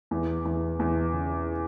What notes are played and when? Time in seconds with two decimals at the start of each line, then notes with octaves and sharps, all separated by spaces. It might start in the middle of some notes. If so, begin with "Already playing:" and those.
0.11 E2
0.45 E2
0.80 E2
1.14 C#3